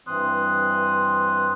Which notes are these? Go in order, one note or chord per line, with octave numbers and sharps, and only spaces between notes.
G2 E3 C4 C6 D#6 F#6